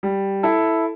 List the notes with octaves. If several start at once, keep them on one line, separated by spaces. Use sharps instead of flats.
G3
E4 A4